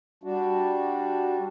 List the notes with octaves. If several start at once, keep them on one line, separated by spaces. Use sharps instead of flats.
G3 D4 F#4